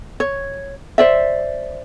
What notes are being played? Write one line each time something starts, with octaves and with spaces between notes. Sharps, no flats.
C#5
C5 D5 E5